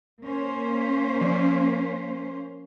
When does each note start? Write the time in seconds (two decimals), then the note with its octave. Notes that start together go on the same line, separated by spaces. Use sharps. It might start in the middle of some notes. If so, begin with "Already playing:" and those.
0.23 A#3 C#4 C5
1.21 F3